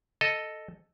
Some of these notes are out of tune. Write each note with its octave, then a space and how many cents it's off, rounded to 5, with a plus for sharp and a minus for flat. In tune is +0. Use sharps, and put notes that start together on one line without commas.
A4 +0 D#5 +0